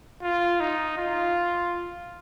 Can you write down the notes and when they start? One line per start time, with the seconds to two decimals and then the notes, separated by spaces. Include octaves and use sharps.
0.23 F4
0.61 D#4
0.97 F4